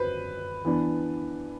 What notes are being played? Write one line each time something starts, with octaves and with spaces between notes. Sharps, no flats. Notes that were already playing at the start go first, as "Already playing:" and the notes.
Already playing: F#3 B4 C5
E3 B3 D4